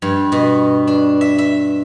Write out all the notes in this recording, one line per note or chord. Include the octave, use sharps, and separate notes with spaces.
G2
B2
D4
E5
E5